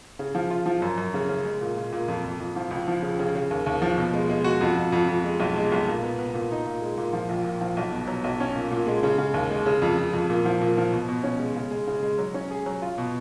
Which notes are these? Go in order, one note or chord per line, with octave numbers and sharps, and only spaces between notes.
C#3
F3
F4
F3
F#2
F#2
C#3
C#3
G#3
A#2
A#2
A#2
F2
F2
F2
F3
C#2
F3
C#3
C#3
C#3
D#2
D#2
F3
B2
G#3
G#3
F#4
F2
F2
F2
F2
G#3
B1
G#3
B1
A#2
B3
B3
A#2
D#4
A#2
G#3
A#2
F3
A#1
A#2
F3
B1
B2
F#3
B1
C#4
A#2
A#2
G#3
C#3
C#3
D#2
G#3
C#3
F2
F2
F2
A#2
F3
A#2
F3
B2
B2
C#4
G#3
C#3
G#3
C#3
G#3
F#3
C#4
G#4
F#3
F4
B2